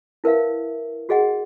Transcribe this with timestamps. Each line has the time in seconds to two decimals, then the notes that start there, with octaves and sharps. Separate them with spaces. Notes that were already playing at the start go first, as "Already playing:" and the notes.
0.24 E4 A#4 B4 E5 F5
1.09 F#4 G#4 D#5 F#5